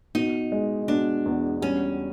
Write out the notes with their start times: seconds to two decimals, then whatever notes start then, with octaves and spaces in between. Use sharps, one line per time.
0.15 B2 D#4
0.52 G#3
0.88 B2 D4
1.26 E2
1.62 G3 C#4